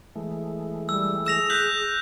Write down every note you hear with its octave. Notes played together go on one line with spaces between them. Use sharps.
E3 G#3 A3
G3 E6
G#4 E6 A#6 E7 F7
F#6 G6 B6 F#7